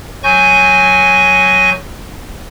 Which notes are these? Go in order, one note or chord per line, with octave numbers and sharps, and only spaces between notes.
F#3 G#5 C#6 G6 A#6